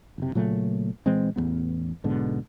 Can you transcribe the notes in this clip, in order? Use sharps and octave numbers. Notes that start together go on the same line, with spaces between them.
F#1 C3
A#2 C#3 F#3 A3
A#2 E3 G#3 C4
A1 E2 G#2 B3
B1 G#2 B2 D3